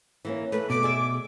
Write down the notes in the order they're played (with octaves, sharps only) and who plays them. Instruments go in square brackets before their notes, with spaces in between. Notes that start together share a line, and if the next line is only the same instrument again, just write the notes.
[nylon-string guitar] E3 A#3 C#4
[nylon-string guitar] A3 [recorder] B4
[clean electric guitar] B2 [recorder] D6
[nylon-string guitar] G#4 D5 E5